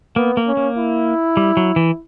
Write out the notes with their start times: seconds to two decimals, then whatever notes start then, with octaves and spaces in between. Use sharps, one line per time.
0.16 A#3 B3
0.37 A#3
0.47 C#4
0.57 A#3
0.77 E4
1.37 G3
1.57 F#3
1.76 E3